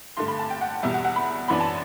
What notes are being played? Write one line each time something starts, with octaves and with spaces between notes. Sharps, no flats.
G2 D3 A3 C6
B5
A5
G5
F#5
E2 B2 G3 E5
F#5
F#5
B5
F#2 E3 B3 D4 B5
A5